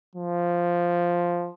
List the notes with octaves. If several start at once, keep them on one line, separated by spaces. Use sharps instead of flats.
F3